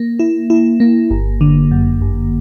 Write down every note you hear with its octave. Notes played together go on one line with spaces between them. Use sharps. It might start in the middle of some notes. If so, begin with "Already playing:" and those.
Already playing: A#3
E4
E4
A#3
G1
D3
F#2
G1